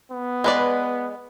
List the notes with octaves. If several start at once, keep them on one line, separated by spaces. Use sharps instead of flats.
B3
G#3 B4 D5